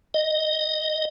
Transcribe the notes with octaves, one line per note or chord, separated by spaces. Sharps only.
D#5